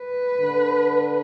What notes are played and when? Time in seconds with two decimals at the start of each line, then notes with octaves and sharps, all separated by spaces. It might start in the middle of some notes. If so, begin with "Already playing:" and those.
Already playing: B4
0.40 D3